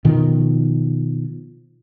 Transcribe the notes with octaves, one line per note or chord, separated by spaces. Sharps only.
B2 D#3 F3